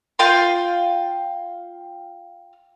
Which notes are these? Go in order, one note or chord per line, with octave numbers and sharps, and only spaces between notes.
F4 F5 G5 C6